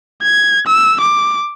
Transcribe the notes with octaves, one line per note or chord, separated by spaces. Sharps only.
G#6
E6
D6